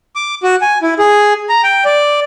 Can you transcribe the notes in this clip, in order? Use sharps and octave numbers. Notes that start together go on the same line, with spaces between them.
D6
F#4
G#5
E4
G#4
A#5
G5
D5